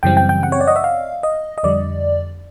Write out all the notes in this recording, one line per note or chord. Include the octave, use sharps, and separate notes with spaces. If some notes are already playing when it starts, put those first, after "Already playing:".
F#2 C#3 E3 G3 C4 G5
G5
G5
F#5
C#5
D5
D#5
E5
F5
D#5
D#5
F2 D3 G3 D5